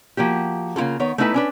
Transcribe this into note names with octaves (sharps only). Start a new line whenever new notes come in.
F3 A#3 F#4 G4
C#3 A#3 E4 F4 A4
D#3 B3 C#5
A3 B3 D#4 E4 B4 A5
C#4 D4 B4